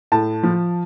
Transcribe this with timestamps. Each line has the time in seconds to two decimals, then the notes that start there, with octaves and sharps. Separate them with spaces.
0.12 A2 A5
0.43 F3